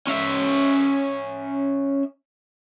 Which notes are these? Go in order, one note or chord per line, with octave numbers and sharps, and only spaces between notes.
C#4 E5